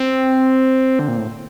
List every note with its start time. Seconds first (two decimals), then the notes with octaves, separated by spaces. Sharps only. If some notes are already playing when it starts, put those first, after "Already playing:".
Already playing: C4
0.99 D3
1.08 A#2
1.18 A2